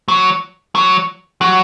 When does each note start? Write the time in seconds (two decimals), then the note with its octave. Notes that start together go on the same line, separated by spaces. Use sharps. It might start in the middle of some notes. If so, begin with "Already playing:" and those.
0.08 F#3
0.75 F#3
1.41 F#3